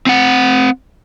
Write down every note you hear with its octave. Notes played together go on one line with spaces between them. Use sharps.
C4 F#5